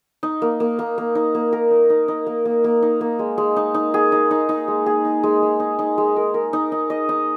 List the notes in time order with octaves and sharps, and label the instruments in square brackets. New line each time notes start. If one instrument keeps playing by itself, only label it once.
[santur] D#4
A#3
A#3
A#3
A#3
D#4
A#3
A#4
D#4
D#4
D#4
A#3
A#3
A#3
D#4
A#3
G#3
G#3
D#4
D#4
G#4
D#4
D#4
D#4
G#3
G#4
D#4
G#3
G#3
D#4
D#4
G#3
A#4
A#4
D#4
D#4
D#5
D#4